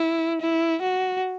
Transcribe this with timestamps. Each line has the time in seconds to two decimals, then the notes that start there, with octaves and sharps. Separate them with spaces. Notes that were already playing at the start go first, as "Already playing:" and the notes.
Already playing: E4
0.41 E4
0.82 F#4